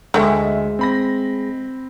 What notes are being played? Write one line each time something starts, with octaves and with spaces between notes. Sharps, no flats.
D2 G#3 A3 E5 G5
C4 B5 A#6